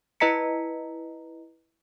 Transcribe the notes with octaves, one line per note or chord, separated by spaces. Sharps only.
E4 B4 D#5 A#5 B6 C#7